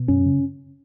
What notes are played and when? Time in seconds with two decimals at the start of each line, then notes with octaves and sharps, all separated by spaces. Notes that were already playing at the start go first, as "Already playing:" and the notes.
Already playing: B2
0.08 F#2 C#4
0.26 C#3